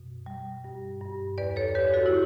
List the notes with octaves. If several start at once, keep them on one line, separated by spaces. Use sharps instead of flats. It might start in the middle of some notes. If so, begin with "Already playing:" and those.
Already playing: F#2 B2
G3
G2
G2
E2 B4 D5
A4 C#5
E2 G4 B4
F#4 A4
E4